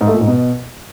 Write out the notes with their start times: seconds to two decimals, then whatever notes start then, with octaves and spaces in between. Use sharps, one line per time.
0.01 G#2
0.07 A3
0.14 A#2
0.21 G#2
0.27 B2